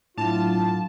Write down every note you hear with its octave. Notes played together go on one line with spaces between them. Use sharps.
A2 F#3 D4 F4 A5